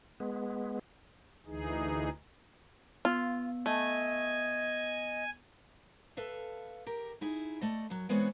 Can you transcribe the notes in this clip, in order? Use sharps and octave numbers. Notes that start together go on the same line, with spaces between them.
G#3 B3
D2 E3 D#4 G#4
B3 F4
A3 D#5 G#5
A4 B4 E5 F5
G4 A#4
D#4 E4 G#4
A3 D5 D#5
F#2 F#3
E3 G#3 B3 C4 B4 C#5